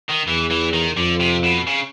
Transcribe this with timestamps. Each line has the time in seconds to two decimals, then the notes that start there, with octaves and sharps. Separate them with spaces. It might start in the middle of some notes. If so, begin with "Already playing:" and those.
0.09 D#3
0.26 E2 E3
0.51 E3
0.73 D#3
0.97 F2 D3
1.20 C3
1.44 B2
1.67 C#3